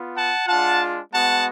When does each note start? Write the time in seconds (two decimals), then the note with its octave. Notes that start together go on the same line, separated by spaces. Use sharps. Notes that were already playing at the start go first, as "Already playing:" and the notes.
Already playing: B3 F4
0.15 F#5 A5
0.48 G#3 D4 F4 F#5 A5
1.12 G#3 B3 F#4 F#5 A5